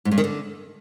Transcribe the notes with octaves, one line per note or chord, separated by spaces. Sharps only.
G#2
G2
D#3
D3